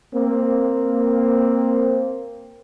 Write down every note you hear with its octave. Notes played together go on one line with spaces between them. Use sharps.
A#3 C4